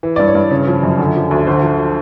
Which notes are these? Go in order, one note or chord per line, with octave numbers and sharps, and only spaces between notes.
E3
G2 D5
C#5
G2
C#3 C#5
F3
F#2
D3
F3
D2
D3 C5
F3